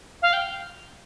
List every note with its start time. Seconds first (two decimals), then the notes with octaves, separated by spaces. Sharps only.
0.22 F5
0.33 G5